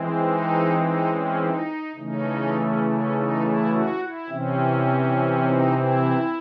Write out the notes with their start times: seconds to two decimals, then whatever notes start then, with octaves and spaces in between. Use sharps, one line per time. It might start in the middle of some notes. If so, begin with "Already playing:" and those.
Already playing: E3 G#3 C4
0.22 D#4
0.79 D#4
1.09 C#4
1.38 D#4
1.96 C#3 E3 A3 C#4 D#4
2.54 C#4
2.84 C#4
3.12 D#4
3.41 E4
3.70 F#4
4.00 E4
4.28 C3 E3 C4 C#4
5.44 D#4
5.73 E4